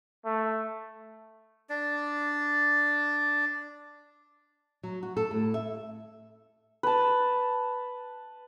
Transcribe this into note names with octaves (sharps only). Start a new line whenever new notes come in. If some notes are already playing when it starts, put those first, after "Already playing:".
A3
D4 D5
F#3
F#4
A4
A2
E5
B4 A5